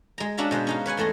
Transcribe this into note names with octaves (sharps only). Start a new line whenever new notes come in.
G#3 A#5
C#4 D4 F#4 E5 F5 A#5
B2 G#3 B4 C5
C#4 D#4 F5
B4 C#5 F#5 G#5
E2 A3 G#4 D#5 C6